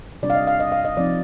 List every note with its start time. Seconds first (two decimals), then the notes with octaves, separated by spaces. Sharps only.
0.23 C3 G3 D4 D5
0.30 F5
0.35 D#5
0.47 F5
0.60 D#5
0.72 F5
0.85 D#5
0.97 F3 C4 D#4 D5